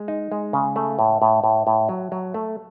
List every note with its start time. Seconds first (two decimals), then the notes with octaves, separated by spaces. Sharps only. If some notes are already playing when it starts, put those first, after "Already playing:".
Already playing: G#3
0.08 D#4
0.32 G#3
0.53 C#3
0.76 A3
0.99 A2
1.22 A2
1.44 A2
1.67 A2
1.89 F#3
2.12 F#3
2.34 A3